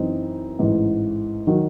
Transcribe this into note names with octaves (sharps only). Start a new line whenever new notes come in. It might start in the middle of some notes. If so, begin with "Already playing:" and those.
Already playing: F#2 E3 C4 D#4
A1 G#2 E3
D#3 F#3